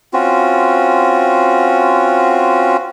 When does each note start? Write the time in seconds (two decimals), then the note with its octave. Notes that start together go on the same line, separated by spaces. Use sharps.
0.13 C4 C#4 F4 F#4